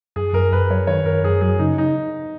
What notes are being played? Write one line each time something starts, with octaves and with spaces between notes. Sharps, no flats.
F#2 G#4
F#2 A#4
F#2 B4
F#3 C#5
D#3 C#5
F#2 A#4
F#2 G#4
F#3 G#4
C#3 D#4
D#4